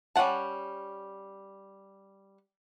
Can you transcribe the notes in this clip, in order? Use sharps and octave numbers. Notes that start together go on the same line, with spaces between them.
G3 C#4 F4 F#5 A5